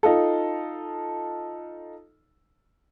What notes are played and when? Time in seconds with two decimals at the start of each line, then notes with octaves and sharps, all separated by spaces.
0.03 D#4 F4 A4